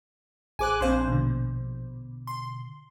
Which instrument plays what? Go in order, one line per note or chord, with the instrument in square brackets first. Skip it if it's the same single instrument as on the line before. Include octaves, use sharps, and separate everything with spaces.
[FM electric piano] A1 G#4 C5 [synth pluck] G#5 D6 F#6
[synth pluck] A#1 C5 [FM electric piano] C4 F5 C6
[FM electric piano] B2 D3
[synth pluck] C6